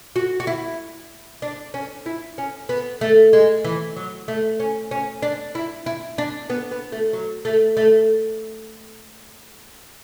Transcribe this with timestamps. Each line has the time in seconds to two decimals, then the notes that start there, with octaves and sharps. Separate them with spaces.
0.16 F#4
0.40 F#4
0.47 E4
1.42 D4
1.74 C#4
2.06 E4
2.38 C#4
2.69 B3
3.01 A3
3.33 G#3
3.64 E3
3.96 F#3
4.28 A3
4.60 C#4
4.91 C#4
5.23 D4
5.55 E4
5.86 E4
6.18 D4
6.50 B3
6.71 B3
6.92 A3
7.13 F#3
7.45 A3
7.77 A3